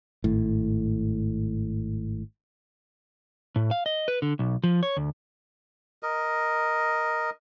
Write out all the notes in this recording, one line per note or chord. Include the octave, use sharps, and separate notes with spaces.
G#1 A2
A2
F5
D#5
B4
D3
B1
F3
C#5
D2
A#4 D#5